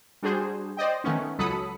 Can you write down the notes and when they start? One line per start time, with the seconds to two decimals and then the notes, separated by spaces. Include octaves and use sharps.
0.23 G3 D4 F#4 G#4 C5
0.77 C5 D5 D#5 G5
1.04 D#3 A3 B3 C#4
1.39 C#2 F#3 A4 B5 D#6 C#7